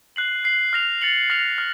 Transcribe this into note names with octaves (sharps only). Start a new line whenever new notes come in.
F#6 C7 F#7
F#6 C7 F#7
F6 A#6 F7
A6 C#7 F#7
F6 A#6 F7
F6